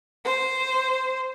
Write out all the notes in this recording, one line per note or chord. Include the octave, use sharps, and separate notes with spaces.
C5